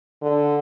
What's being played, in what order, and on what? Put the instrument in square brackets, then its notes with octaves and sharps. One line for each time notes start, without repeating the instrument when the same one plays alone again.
[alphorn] D3